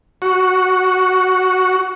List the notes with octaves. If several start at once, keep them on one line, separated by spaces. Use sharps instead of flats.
F#4 C#6